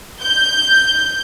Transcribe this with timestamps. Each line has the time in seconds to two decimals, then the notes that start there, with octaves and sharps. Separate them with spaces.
0.22 G6